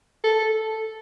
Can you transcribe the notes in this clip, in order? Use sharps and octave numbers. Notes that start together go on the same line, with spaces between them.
A4